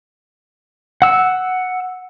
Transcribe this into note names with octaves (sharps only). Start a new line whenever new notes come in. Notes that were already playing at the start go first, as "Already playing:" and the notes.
F#5 E6